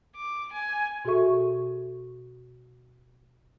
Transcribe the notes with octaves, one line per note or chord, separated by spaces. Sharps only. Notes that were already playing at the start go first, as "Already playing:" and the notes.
D6
G#5
B2 F#4 G#4 A4 E5 C#6